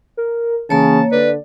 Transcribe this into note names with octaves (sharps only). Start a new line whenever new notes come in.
A#4
C#3 E3 A#3 C#5 A5
D3 B4 D5